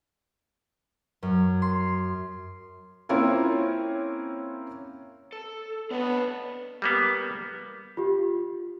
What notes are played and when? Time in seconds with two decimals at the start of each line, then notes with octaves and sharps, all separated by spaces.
1.23 F#2
1.62 C6
3.09 A#3 C4 C#4 E4 F4
5.33 A4
5.91 B3 D4 C#5 D#5
6.82 G3 A#3 B3
7.97 F4 G4